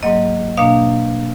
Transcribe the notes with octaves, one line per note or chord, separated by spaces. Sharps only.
G#2 F#3 A#3 D#5
B2 A#3 D4 F5